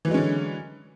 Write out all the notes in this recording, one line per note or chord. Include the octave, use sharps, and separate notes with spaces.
D3 E3 F#3 G#3 C#4